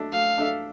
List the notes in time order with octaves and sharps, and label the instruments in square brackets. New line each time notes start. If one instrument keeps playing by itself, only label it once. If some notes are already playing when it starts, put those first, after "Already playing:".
Already playing: [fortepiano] A3 D4 A4 E5
[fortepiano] A3 [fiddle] F5
[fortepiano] D4 A4 E5